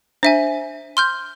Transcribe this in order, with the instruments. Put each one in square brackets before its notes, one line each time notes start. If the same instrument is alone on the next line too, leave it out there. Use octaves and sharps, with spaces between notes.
[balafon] D4 [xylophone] C5 E5 G#5
[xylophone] C6 F6 G6